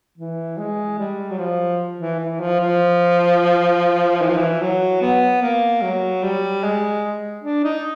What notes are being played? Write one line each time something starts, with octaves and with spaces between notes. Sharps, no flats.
E3
G#3
G3
F#3
F3
E3
E3
F3
F3
E3
F3
E3
F#3
B3
A#3
F#3
G3
G#3
D4
D#4